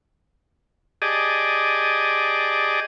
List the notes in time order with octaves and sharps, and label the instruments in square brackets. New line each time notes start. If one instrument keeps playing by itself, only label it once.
[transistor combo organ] G4 G#4 D5 D#5 A5